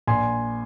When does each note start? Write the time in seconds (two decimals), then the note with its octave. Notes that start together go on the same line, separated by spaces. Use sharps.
0.07 A#1 G#5 C6